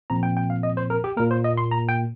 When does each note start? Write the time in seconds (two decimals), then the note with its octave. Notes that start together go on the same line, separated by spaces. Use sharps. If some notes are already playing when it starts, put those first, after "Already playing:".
0.10 A#2 F3 C4 A#5
0.23 G5
0.37 G5
0.50 F5
0.63 D#5
0.77 C5
0.90 A#4
1.04 G4
1.17 A#2 A#3 A#4
1.31 C5
1.44 D#5
1.57 C6
1.71 A#5
1.89 G5